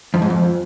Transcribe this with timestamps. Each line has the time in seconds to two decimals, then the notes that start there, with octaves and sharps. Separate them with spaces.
0.14 F2
0.22 G#2
0.30 F2